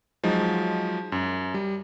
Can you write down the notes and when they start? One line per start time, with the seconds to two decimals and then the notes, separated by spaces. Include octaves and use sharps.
0.23 F3 F#3 G#3 D#4
1.12 F#2
1.54 G3